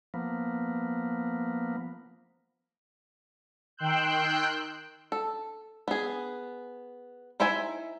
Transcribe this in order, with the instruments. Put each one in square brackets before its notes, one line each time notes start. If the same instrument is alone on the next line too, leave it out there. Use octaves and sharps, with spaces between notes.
[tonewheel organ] F3 A#3 B3
[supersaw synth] D#3 G5 C6 E6 F#6 G6
[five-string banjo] A4
B3 G#4
D#4 E4 C5 E5 G#5